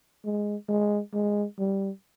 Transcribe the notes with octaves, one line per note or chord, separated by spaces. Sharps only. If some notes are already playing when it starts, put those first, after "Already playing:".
G#3
G#3
G#3
G3